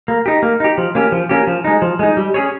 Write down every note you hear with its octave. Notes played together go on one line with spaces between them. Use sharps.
A#3
D#4 G4
A#3
D#4 G4
F3
A#3 C#4 G4
F3
A#3 C#4 G4
F3
G#3 D#4
F3
G#3 D#4
G3
C#4 G#4 C#5